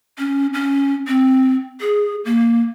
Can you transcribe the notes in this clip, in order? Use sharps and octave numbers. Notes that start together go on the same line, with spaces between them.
C#4
C#4
C4
G#4
A#3